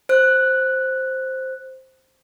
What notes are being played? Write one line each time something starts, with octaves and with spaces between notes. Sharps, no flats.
C5 F#6